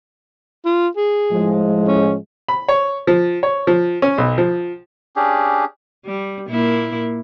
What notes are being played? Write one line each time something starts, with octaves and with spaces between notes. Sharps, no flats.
F4
G#4
A2 F3 G#3
C#4
B5
C#5
F3
C#5
F3
C#4
B1
F3
C#4 D4 G4 G#4
G3
A#2 A#3 E4